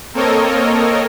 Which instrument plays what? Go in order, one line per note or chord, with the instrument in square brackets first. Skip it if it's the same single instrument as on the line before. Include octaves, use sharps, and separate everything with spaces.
[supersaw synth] A#3 C4 A4 A#4 C#5 D#5